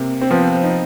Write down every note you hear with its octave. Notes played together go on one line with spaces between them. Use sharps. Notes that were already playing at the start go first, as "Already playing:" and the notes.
Already playing: C3 A#3
C4
F3 B3
D#4